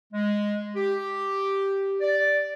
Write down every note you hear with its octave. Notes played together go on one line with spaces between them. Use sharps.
G#3
G4
D5